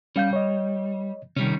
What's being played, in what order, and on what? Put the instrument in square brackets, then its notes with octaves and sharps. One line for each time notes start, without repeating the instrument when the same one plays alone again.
[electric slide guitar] G3 [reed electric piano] C#4 F5 G6
[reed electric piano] C#5 D#5
[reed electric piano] C3 [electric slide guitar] D#3 G3 C#4